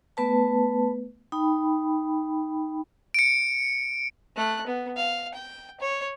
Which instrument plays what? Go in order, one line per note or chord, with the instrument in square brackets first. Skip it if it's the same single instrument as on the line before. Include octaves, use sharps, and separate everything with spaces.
[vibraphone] A3 B3 B4 A5
D#4 G5 B5
[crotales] C#7 D7
[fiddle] A3 F#6
B3
F5
G5
C#5